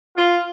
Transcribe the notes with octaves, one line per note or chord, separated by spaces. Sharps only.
F4